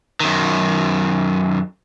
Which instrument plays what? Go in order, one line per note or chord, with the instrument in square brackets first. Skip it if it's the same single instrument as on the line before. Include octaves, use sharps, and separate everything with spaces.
[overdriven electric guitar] F#2 D#3